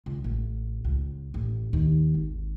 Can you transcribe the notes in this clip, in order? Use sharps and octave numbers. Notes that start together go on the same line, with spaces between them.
C#2
A1
C#2
A1
D#2
G#1